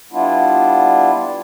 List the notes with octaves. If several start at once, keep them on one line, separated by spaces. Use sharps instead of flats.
G3 B3 D4 E4 F4